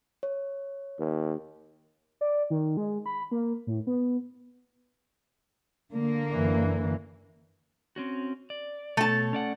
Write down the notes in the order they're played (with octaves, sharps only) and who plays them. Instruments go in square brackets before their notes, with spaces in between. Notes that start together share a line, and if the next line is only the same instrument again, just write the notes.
[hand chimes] C#5
[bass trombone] D#2
[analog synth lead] D5
D#3
G#3
B5
A#3
A2
B3
[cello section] D3 A#3
[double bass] F#2 E3
[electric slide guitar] C4 C#4 F#4
D5
[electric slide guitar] B2 A4 C#5 [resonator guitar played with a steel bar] A3 A5
[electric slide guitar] C#4 D5 F#5